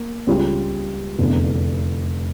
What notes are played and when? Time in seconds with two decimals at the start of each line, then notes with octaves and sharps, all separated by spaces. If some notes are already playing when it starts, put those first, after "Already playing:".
Already playing: A#3
0.27 C#2 C#3 G3 C#4 F4
1.18 F1 E2 D3